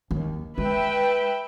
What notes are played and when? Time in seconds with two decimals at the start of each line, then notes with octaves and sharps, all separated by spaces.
0.11 D#2
0.58 G#3 B4 E5 G5